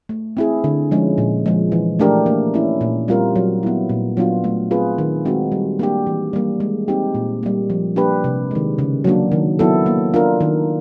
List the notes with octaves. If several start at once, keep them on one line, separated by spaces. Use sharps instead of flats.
A3
C4 E4 G#4
D3
F3 G#3 C#4
A#2
F3 G#3
E3
A3 D4 G4 A#4
A#3
C#4 E4
A#2
G3 C4 F4 A#4
F#3
B3 E4
A#2
F#3 B3 D4 F4
A3
C4 F4 G#4 B4
D#3
G#3 C4 D#4 F#4
G3
A#3 D4 G4
E3
G3 A#3
G#3
C4 D#4 G4
A#2
G3 A#3
F3
A#3 D4 G4 B4
C3
D#3 G#3
C#3
F#3 A#3 D4
D#3
F#3 B3 E4 A4
A#3
D4 F4 A#4
D#3